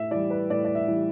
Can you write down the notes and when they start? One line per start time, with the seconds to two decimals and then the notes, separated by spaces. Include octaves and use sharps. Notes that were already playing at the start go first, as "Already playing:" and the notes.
Already playing: A2 E5
0.11 E3 G3 D5
0.30 B4
0.50 A2 D5
0.65 D5
0.75 E5
0.88 E3 G3